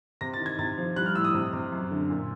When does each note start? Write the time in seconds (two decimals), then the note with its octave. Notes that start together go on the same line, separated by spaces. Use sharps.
0.21 C3 A#6
0.33 A6
0.40 D#3
0.46 G#6
0.59 C3 A6
0.78 F3
0.96 G3 F#6
1.06 F6
1.15 A2 E6
1.24 D#6
1.34 C3
1.53 C3
1.72 F#2
1.91 D3
2.10 A#2